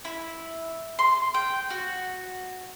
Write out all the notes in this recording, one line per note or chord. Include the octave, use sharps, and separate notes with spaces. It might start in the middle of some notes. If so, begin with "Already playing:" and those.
E4
C6
G5
F#4